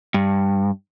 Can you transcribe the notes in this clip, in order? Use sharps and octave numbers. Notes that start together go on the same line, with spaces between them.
G2